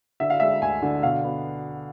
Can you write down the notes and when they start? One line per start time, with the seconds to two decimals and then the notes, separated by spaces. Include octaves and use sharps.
0.20 D3 E5
0.30 F5
0.40 G#3 E5
0.62 D2 G#5
0.82 D3
1.03 B2 F5
1.24 B3